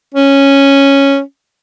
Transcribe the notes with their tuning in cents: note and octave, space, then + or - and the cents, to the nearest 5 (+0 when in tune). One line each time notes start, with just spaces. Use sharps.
C#4 -5